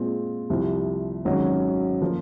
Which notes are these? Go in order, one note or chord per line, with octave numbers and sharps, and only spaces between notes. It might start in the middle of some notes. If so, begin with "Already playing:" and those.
Already playing: A#2 G#3 C4 F4
C2 C3 F3
G#1 G#2 F#3 C#4 F#4
F3 A#3 F4 A#4